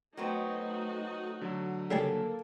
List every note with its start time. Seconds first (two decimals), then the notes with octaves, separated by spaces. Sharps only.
0.17 F#3 A3 B3 C4 D#4 F#4
1.41 D3 F#3
1.91 C#3 G3 A#3 G#4 A4